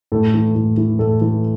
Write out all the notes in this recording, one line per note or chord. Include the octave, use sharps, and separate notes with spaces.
A2 A4
E3
A2
E3
A2 A4
E3